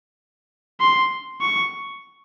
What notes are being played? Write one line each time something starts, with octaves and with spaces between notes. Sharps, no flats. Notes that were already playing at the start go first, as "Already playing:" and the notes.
C6
C#6